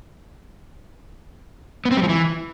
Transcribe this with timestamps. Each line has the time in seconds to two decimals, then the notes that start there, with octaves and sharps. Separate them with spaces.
1.85 B3
1.91 C4
1.97 G3
2.03 F3
2.09 E3